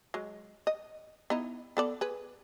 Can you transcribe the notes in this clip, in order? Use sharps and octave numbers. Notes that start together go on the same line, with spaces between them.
F#3 G#3
D#5
B3 D#4 E4
B3 A4 D5
G#4 B4